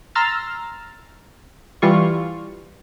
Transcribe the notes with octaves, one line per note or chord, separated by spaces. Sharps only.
A#5 C6 E6 F6 A6
E3 G3 F4 C#6